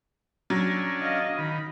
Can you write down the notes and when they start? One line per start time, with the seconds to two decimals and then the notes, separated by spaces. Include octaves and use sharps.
0.50 F#3 C#4 D4
1.01 D#5 F5
1.39 D#3 B5